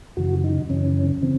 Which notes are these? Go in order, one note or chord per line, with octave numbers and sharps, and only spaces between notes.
F#2 C#3 E3 F#4
D#4
F#2 C#3 E3 C#4
C#3 E3 C4